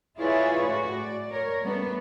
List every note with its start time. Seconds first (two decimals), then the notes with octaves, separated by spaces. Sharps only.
0.18 E4 F4 G#4 B4 C#5 D5
0.64 A2 F#4
0.96 D5
1.31 A#4 C#5
1.62 G3 A3 B3 D4